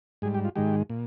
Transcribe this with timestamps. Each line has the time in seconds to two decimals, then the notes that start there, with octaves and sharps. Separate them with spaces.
0.22 G#2 G3 G#4
0.34 G4
0.45 F4
0.56 G#2 D#3 G#3 G4
0.90 A#2